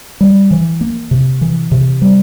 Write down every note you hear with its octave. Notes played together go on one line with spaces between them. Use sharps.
G3
E3
A#3
C3
E3
C3
G3